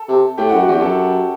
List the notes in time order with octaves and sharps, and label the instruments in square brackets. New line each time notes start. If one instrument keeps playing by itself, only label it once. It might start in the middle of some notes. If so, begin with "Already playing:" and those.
Already playing: [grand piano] A4 A5
[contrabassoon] C3
[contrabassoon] A2 [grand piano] G4 G5
[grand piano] F#4 F#5
[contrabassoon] F#2
[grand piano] F#4 F#5
[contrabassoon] E2
[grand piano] G4 G5
[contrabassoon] E2
[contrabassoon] F#2 [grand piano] A4 A5